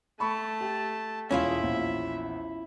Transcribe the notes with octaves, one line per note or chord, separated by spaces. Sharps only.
A3 A5 B5 C#6
G4
E1 C#4 E4 F4 E5
A#1 E2